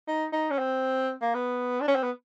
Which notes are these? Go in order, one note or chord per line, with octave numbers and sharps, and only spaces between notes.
D#4
D#4
C#4
C4
A#3
B3
D4
C#4
C4
B3